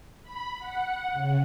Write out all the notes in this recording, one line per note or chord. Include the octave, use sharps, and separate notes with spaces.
B5
F#5
C#3